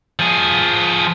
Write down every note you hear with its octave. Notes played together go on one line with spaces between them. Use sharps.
F3 G#4